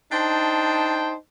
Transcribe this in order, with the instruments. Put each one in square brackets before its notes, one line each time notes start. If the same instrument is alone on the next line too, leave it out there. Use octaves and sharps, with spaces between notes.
[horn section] D4 D#4 C5 G5 A5